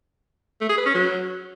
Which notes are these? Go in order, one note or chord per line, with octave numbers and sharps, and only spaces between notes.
A3
G#4
B4
C#4
F#3